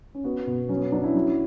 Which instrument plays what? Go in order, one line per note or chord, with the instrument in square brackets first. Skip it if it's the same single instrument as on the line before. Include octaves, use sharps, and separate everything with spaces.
[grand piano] C#4
[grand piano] B3 [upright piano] F#4
[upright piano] B2
[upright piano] F#3 [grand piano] C#4
[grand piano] B3
C#4
[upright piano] F#3 [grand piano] B3 D4
[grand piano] C#4 E4
[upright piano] F#3